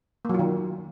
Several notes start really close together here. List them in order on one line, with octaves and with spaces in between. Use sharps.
A#3 F#3 F4 D#3